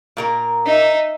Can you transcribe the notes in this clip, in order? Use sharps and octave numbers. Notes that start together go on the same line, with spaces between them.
A#2 A#3 A#4
D#4 E5